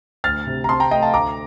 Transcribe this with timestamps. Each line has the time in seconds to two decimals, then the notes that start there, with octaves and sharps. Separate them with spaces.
0.24 D2 F6 A6
0.47 C3
0.64 A#5
0.69 C4 A5 C6
0.80 G5 A#5
0.91 A3 D#5 G5
1.02 F5 A5
1.13 D2 A#5 D6